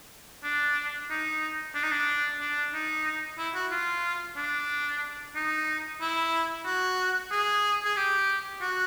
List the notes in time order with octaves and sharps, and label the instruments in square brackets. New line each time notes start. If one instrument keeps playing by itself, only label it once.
[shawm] D4
D#4
D4
D#4
D4
D4
D#4
E4
F#4
F4
D4
D#4
E4
F#4
G#4
G#4
G4
F#4